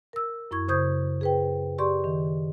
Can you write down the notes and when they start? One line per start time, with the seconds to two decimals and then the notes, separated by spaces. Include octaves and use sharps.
0.13 A#4 E6
0.51 F#2 E4 C#6 G#6
0.68 C#3 C5 C#6 D#6 G6 G#6
1.21 G#4 B4 G5
1.78 G4 D5 C6 C#6
2.04 D#3